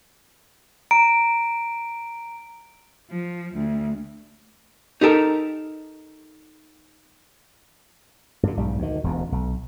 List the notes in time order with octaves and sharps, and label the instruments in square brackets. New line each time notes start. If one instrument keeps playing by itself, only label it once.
[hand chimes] A#5 [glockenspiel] D7
[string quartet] F3
D2
[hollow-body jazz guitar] D#4 G4 A4 A#4
[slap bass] G2 D3
B1 G#2 G3
D2 D#3
E1 D2
B1